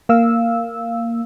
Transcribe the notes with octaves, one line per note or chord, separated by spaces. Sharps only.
A#3 F5 E6